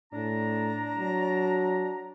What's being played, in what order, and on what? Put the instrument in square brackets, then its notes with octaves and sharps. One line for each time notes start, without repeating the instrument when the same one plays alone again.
[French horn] A2 [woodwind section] D4 A#5
[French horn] F#3